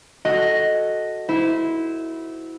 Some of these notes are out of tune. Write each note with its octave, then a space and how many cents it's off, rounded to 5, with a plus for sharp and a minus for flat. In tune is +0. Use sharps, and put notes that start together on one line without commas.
F#4 +0 A4 +0 D#5 +0
E4 -15 C5 -30